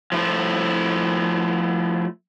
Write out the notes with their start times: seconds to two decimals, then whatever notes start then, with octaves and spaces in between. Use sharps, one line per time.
0.12 F3 A3 E4